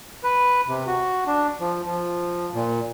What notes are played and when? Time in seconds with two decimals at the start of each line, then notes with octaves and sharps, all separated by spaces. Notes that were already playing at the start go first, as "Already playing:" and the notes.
0.24 B4
0.68 C3
0.87 F#4
1.26 D4
1.60 F3
1.86 F3
2.54 A#2